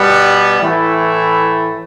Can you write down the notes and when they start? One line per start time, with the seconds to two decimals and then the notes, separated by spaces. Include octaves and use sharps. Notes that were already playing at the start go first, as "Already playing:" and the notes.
Already playing: B2 G3 B3
0.60 A2 E3 A3 E4